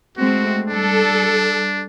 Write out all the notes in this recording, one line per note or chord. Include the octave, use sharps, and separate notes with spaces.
G#3 A3 C4 F#4
G3 D4 A4